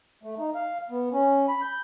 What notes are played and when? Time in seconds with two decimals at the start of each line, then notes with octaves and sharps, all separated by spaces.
0.23 A3
0.39 D#4
0.55 F5
0.90 B3
1.13 C#4
1.48 B5
1.62 G6